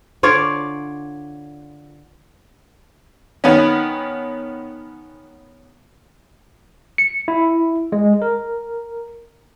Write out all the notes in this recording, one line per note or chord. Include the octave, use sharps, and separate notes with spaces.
D3 F4 C#5 D5
D#3 B3 C#4
C#7
E4
G#3
A#4